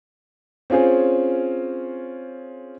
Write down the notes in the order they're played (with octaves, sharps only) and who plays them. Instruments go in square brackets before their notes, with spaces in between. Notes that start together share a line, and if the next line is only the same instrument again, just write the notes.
[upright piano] C4 C#4 F4 G#4 C5